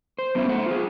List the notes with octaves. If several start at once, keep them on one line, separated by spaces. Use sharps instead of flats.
C5
F#3 B3 C#4 F4 E5
A3 C5 F#5
F4 G#4